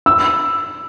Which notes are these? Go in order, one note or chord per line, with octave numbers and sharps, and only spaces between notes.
E6